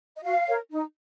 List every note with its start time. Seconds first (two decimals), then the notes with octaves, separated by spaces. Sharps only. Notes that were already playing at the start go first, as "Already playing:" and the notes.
0.16 D#5
0.23 F#4 F5
0.47 A#4 C#5
0.71 D#4